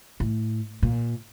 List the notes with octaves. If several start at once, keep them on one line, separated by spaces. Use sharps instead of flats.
A2
A#2